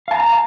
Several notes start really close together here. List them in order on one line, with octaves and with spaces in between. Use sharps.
F5 A5 A#5